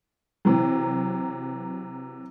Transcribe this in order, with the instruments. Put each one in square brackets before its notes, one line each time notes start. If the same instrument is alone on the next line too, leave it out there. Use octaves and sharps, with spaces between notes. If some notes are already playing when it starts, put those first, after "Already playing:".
[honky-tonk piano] C3 E3 F#3